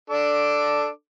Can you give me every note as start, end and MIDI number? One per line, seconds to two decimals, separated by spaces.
0.10 0.89 62
0.10 0.89 69
0.10 0.89 86